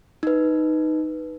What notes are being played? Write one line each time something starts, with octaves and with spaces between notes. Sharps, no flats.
D#4 B4